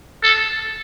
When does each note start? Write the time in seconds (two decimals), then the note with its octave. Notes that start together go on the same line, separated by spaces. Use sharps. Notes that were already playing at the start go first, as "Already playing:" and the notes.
0.23 A4